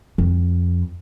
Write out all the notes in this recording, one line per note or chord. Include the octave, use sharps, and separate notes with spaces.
F2